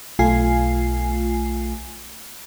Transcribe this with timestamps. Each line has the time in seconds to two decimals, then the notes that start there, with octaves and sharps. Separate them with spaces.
0.19 B1 A3 F4 G#5 C7